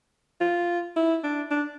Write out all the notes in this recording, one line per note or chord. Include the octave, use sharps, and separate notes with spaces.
F4
E4
D4
D4